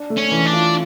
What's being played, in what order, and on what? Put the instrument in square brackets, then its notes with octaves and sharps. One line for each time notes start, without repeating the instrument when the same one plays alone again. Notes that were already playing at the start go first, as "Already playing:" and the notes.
Already playing: [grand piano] D4
A3
[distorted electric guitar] C#4
[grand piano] E3
[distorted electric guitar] D4
[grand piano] F4